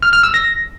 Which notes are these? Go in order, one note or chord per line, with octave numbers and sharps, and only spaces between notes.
F6
F6
E6
A#6